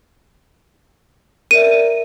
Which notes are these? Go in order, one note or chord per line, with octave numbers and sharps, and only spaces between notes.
A#4 D5 E5 D#7